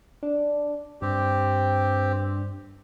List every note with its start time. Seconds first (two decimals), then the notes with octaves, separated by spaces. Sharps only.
0.23 D4
1.02 G2 C4 G4